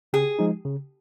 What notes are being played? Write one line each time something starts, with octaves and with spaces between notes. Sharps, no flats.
C#3 G#4
F3 G#3 D#4
C#3